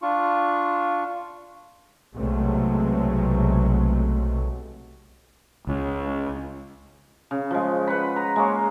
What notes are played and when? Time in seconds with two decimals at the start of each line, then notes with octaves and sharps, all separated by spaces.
0.02 D4 F4 C#6
2.15 B1 C3 F#3 G#3 A3
5.67 C#2
7.31 C#3
7.51 F3 G#3
7.87 B4 F#5 B5
8.16 A#5
8.36 G#3 A#3 C#5